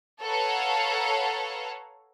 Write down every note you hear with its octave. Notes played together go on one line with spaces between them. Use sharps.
A4 B4 C#5 F5 F#5 A#5